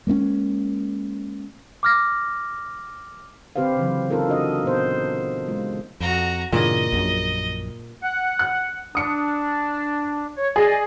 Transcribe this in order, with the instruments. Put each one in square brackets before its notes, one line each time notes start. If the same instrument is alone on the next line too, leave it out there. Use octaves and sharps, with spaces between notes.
[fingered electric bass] G#3 A#3 B3 C#4
[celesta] D6 F6 A#6
[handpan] D3 C4 G4 B4 C5 F5
C#3 E3 F#3
C#4 D#4 F4 A4 A#4
D4 F#4 D#5
A#2 B3 C5
G#3 F4
[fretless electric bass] F2 [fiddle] F#4 A#5
[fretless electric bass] G2 C#3 E3 [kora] A#2 [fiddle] D#5
[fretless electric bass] A#1 F#2
[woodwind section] F#5
[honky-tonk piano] F#6
[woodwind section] D4 [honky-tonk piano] D#6 C#7
[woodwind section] C#5
[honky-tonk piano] G#4 [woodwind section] D5 D#5